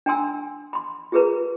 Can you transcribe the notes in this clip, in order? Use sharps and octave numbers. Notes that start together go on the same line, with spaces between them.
D4 G5 G#5 A#5 C6 E6
B5 C6
F4 G4 G#4 A#4 B4 A#5